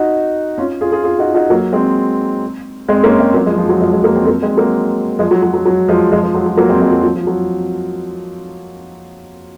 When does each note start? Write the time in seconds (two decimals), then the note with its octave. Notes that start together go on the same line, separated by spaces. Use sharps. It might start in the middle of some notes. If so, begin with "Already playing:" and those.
Already playing: D#4 F#4
0.58 C#4 F4
0.81 F4 G#4
0.92 F4 G#4
1.03 F4 G#4
1.19 D#4 F#4
1.34 D#4 F#4
1.50 F#3 A#3
1.72 G#3 C4
2.88 G#3 C4
3.04 A#3 C#4
3.19 G#3 C4
3.34 F#3 A#3
3.46 F3 G#3
3.58 F3
3.69 F#3
3.81 F3 G#3
3.92 F3 G#3
4.04 F#3 A#3
4.15 G#3 C4
4.27 F#3 A#3
4.42 G#3 C4
4.57 F#3 A#3
5.19 F3 G#3
5.31 F#3
5.42 F#3
5.54 F#3
5.65 F#3
5.88 F3 G#3
6.11 F3 G#3
6.23 F3
6.34 F#3
6.46 F#3
6.57 F#3 A#3
6.69 G#3 C4
6.81 F3 G#3
6.92 F#3
7.03 F#3
7.15 F3
7.27 F#3